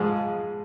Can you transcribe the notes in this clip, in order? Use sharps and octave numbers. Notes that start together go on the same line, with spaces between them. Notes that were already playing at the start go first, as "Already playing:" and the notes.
Already playing: G#2 F3 G#3